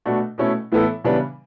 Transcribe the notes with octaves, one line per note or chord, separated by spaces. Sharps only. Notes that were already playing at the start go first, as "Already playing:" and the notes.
B2 A3 D4 F#4
B2 A3 C#4 E4
A2 E3 B3 E4 A4
C#3 E3 G3 B3 D4